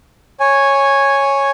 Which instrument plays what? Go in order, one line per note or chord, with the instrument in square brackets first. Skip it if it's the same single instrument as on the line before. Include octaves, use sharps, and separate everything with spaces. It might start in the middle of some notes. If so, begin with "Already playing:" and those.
[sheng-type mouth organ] C#5 G#5